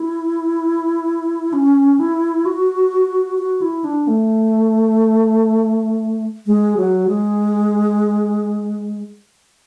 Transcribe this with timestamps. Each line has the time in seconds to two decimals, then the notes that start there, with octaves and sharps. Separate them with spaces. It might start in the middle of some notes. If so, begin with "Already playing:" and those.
Already playing: E4
1.53 C#4
2.00 E4
2.45 F#4
3.39 F#4
3.61 E4
3.84 D4
4.07 A3
6.46 G#3
6.77 F#3
7.08 G#3